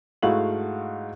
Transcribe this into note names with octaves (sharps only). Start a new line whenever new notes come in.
G#2 A3 E4 F#4 F5 F#7